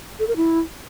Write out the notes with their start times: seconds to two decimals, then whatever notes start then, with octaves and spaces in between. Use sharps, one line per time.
0.19 A4
0.28 A#4
0.36 E4